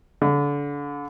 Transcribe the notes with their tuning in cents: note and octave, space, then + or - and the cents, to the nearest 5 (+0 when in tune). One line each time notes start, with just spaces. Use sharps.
D3 -30